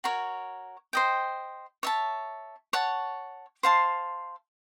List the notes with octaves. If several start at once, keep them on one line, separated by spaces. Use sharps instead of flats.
F#4 A#4 C#5
C5 D#5 G5
C#5 E5 A5
C#5 F#5 A5
C5 F5 A5 C6